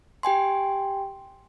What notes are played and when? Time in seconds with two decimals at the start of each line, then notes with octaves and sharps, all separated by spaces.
0.23 G4 G5 G#5 C6